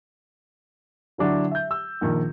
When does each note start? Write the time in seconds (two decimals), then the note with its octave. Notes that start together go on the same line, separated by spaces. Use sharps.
1.18 D3 F#3 D4 E4
1.51 E5 G6
1.71 E6
2.01 A#1 D#3